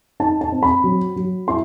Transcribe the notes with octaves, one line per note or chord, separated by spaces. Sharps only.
D#4 A5
A5
C4
B5
F#3
F#3
E4 C6